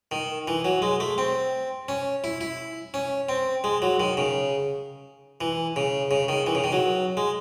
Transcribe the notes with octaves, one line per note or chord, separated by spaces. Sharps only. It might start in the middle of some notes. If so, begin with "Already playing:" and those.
D#3
E3
F#3
G#3
A3
C4
C#4
E4
E4
C#4
C4
G#3
F#3
D#3
C#3
E3
C#3
C#3
D#3
E3
C#3
D#3
F#3
G#3